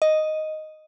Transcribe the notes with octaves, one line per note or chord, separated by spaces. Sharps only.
D#5